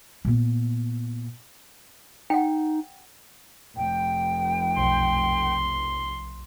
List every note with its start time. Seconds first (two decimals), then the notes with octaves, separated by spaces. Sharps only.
0.25 A#2 B3
2.30 D#4 F#5 G5
3.77 F1 G5
4.78 B1 C6